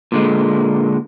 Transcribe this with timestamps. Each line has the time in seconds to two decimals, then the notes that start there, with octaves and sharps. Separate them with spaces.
0.12 A#2 D3 G#3